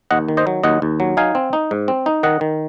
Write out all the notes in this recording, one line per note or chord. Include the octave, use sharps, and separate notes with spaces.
D#2 D#5 F#5
D#3
C5 D#5
F#3
D#2 D#5 F#5
D#2
F#3
D#4 F5 G#5
C4
D#4
G#2
C4
D#4
D#3 D#5 F#5
D#3